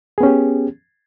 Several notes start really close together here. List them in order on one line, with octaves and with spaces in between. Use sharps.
G#4 B3 C#4 G4